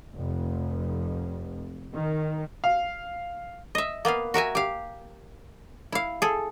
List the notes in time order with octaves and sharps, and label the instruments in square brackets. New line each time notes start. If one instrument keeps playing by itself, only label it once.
[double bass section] F1 F2
D#3
[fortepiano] F5
[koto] D#5 E5
A#3 B3 B4 F5
F#4 A#4 E5 G#5
G4 F5
E4 F5
G#4 A4